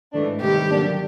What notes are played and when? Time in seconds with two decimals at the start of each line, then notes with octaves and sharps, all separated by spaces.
0.13 G#2 E3 A3 D4
0.41 C3 D#3 G3 G4
0.70 D3 F#3 A#3 D4